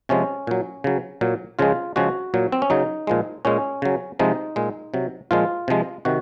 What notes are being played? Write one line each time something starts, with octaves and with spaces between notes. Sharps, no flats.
C3 F3 G#3 C#4
A#2 F#3
C#3 F#3
A#2 F#3
C#3 F3 G#3 F4
C#3 F3 G#3 F#4
A#2 F#3
C4
C#4
C#3 F#3 D#4
A#2 F3 G#3
A#2 G#3 C#4
C#3 F#3
C3 F3 G#3 D#4
A#2 G#3
C3 F#3
A#2 F3 G#3 F4
C3 F3 G#3
C3 D#3 F#4